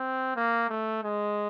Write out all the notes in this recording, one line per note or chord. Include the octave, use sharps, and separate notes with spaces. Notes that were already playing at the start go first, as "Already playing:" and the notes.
Already playing: C4
A#3
A3
G#3